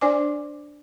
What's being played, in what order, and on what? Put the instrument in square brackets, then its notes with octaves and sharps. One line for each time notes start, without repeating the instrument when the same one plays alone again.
[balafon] D4 C5 D5 G#5 D6